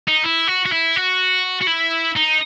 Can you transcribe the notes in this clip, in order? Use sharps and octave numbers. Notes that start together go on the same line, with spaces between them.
D#4
E4
F#4
F#4
E4
F#4
F#4
E4
D#4